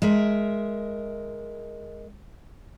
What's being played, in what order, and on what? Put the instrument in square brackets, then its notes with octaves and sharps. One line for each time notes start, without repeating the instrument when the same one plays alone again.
[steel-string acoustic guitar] G#3 A#4 E5